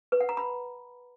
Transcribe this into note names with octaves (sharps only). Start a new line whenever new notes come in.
B4
F#5
A#5
B5